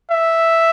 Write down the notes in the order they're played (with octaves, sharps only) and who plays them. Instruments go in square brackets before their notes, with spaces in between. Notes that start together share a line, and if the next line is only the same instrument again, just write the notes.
[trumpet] E5